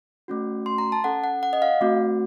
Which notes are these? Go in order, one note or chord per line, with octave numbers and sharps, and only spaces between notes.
A3 C#4 F#4
C6
A#5
A5
C#4 A4 F#5
F#5
F#5
D#5
F5
A3 C4 F#4